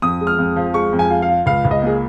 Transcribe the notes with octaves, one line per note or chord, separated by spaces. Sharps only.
F2 D#6
G#3
F6
F2
F3
G#3 C#6
F2
G#5
F4
F5
F4
C#2 F5
C#2
D#5
A#3 G#4